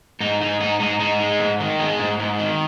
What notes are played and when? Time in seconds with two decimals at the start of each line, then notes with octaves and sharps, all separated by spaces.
0.20 G#2 D#4
0.41 G#2 D#4
0.60 G#2 D#4
0.80 G#2 D#4
1.00 G#2 D#4
1.21 G#3
1.40 G#2
1.60 D#3
1.80 G#3
1.99 G#2
2.20 G#2
2.39 D#3